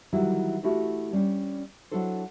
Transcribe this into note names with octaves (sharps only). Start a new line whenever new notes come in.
D#3 E3 F#3 G3 E4
A3 E4 F#4 G4
G3 C#4 D4
F#3 D4 E4 A4 C5